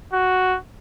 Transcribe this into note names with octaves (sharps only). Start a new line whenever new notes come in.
F#4